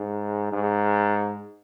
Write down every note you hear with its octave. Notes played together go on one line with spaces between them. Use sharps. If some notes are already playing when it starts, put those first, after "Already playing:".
Already playing: G#2
G#2